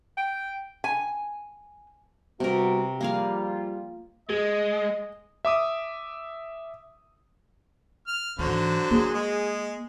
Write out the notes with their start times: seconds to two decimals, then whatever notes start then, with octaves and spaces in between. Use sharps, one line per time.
0.17 G5
0.84 G#5
2.40 C3 G3 B3 F#4 A#4
3.01 F3 G3 A#3 F4 G#4 F5
4.29 G#3 G#4 D#5
5.45 E5 D6 D#6
8.07 F6
8.39 G#2 D3 E3 F#3 C5
8.91 A#3 G#4
9.14 G#3